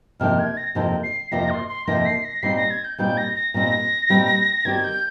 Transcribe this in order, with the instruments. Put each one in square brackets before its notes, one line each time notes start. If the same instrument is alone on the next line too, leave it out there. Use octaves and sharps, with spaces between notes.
[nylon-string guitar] F2 C3 F3 A#3 D#4 [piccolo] F6
[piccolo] G#6
A#6
[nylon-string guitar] F2 C3 F3 A#3 D#4
[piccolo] C7
[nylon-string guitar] F2 C3 F3 A#3 D#4 [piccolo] A#6
[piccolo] C6
C6
[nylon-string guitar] F2 C3 F3 A#3 D#4 [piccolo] A#6
[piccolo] C7
A#6
[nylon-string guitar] A#2 G3 C4 D#4 [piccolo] C7
[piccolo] A#6
G#6
G6
[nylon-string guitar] A#2 G3 C4 D#4 [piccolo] G6
[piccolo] A#6
A#6
[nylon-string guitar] A#2 G3 C4 D#4 [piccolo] A#6
[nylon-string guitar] A#2 G3 C4 D#4
[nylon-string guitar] D#3 G3 C4 G4 [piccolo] G#6
[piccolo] G6